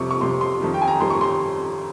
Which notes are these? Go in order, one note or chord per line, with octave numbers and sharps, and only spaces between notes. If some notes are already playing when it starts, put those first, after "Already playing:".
Already playing: F2 C3 G3 C#6
C#6
F2 C3 G3 C6
C6
F2 D#3 G3
G5
G#5
A#5
F2 D#3 G3 C6
C#6
C6